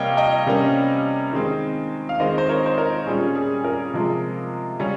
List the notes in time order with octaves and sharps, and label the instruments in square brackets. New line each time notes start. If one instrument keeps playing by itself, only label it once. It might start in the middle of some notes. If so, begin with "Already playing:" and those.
Already playing: [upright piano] C3 G3 A#3 C#5 D#5 F5 G5
D#5 G5
C3 G3 A#3 C#4
D#3 G#3 C4
F5
D#3 G#3 C4 C5 D#5
C5
A#4 C#5
C5
A#4
A#2 G3 C#4 G#4
G#4
A#4
C3 F3 G#3
C#3 G3 C#4